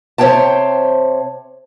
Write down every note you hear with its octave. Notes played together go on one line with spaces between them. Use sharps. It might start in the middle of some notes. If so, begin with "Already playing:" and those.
C3 C5 C#5 F5 G5 A5